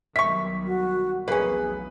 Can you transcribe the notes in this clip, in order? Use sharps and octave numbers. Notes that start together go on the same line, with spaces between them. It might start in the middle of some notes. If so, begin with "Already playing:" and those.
B1 D#3 G3 E5 C#6 B6
F#4
F1 B1 E2 A#3 C#4 G#4 B4